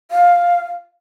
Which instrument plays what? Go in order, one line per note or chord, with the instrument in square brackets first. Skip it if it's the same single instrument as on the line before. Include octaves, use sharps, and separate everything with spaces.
[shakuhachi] F5